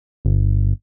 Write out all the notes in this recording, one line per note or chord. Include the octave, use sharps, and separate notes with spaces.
G1